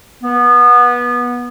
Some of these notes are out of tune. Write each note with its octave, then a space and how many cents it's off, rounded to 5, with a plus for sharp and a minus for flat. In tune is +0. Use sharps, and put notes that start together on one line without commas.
B3 -20